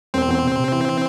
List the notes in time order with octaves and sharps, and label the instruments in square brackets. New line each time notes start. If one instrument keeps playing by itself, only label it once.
[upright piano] E1 [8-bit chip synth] C4
[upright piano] E2
C3
C3
E3
E3